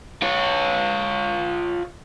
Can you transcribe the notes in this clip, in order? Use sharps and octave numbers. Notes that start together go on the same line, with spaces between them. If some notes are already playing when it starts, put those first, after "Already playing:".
F4 C#5